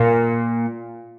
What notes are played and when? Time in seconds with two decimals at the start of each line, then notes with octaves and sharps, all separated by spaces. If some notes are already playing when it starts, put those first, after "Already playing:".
Already playing: A#2